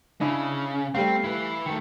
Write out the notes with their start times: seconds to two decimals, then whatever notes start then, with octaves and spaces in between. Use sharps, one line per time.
0.21 C#3 D4 E4 D#5
0.95 G3 A3 C4 F5 C7
1.24 E4 B4
1.66 D#3 A3 C#7